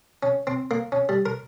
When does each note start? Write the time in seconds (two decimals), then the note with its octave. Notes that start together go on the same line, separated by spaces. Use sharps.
0.23 C#4
0.47 C4
0.71 A#3
0.92 C#4
1.09 G3
1.26 A#4